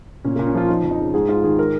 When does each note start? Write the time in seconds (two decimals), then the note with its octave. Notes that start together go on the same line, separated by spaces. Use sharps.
0.24 A#2 C#4
0.36 A#2 A#3
0.47 C#4
0.55 F3 F4
0.68 F3 D#4
0.83 F2
0.91 D#4
0.99 C#3
1.14 G#2 G#4
1.29 G#2 F4
1.44 D#3 G#4
1.59 A#4